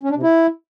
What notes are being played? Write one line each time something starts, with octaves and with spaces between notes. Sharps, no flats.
C#4
D4
C3
E4